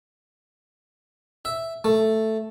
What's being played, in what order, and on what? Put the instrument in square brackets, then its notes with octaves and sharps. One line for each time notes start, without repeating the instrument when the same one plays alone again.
[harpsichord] E5
A3